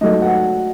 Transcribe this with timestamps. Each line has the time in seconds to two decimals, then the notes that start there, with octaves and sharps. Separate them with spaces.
0.01 G#2 F#3 A3 D#5
0.22 F#5